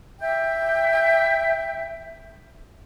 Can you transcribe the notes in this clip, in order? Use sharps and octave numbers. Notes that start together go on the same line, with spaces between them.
E5 G5